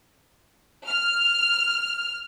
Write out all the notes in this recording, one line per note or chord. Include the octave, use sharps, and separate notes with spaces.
F6